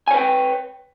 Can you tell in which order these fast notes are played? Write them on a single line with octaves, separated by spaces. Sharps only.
G#5 C#5 B4 G5